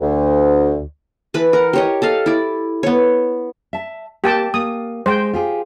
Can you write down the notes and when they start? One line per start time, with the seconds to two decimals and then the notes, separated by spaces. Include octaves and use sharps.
0.01 D2
1.34 E3 B4 A5 B5
1.53 A#4 F#5
1.73 G4 C#5 D#5
2.02 A4 D#5 F5
2.26 E4 D5
2.83 B3 C#5
3.73 E5 A5
4.24 A#3 G4 G5 A5
4.54 A#3 D#6
5.06 G#3 C5 G5
5.33 F4 G4 G#4